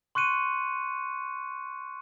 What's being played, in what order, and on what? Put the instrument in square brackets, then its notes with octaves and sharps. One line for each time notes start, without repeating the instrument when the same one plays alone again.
[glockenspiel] C6 C#6 F#6 C#7 D#7